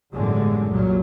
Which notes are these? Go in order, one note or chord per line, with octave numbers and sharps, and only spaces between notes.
G1 F#2 A2 D3 E3 G#3
C2 A#2 F#3